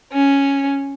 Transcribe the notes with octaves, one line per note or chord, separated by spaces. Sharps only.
C#4